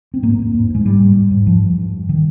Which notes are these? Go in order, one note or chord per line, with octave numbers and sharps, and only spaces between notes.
C4
G#2 A#3
G#2
G#2
G#2 G#3
G#2 G3
G#2
G#2
G#2
G2 F3
G2
G2
G2
D#3